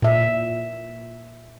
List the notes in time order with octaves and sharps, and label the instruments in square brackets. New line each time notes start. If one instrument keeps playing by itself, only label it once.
[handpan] A#2 E5